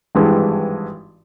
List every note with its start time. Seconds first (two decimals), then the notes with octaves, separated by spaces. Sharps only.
0.15 G#1 G2 E3 G#3